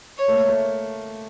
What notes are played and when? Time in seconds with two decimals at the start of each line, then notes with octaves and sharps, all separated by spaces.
0.18 C#5
0.28 A3
0.33 A#3
0.48 A3